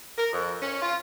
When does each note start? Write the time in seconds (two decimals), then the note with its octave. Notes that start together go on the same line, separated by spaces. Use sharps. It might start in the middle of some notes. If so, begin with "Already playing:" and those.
0.18 A#4
0.33 F2
0.62 C#4
0.82 F4